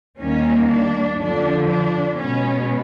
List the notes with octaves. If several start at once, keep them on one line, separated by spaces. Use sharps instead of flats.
D#2 D#3 G3 A#3 C#4
D4
F2 D3 F3 D4
D4
B2 G#3 B3 C#4